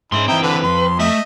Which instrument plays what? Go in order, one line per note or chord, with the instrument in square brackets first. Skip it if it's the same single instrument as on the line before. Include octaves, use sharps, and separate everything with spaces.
[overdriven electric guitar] G#2 G#3 [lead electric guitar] C#4 C6 [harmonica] E4
[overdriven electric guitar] E3 C4 [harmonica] D#4 E4 [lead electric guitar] G5
[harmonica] D3 [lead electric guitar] B4
[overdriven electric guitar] F2 [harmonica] C6
[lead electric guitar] A3 [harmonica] D#5 E5